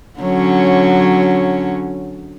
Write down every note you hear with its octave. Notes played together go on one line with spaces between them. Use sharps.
D3 F#3 C#4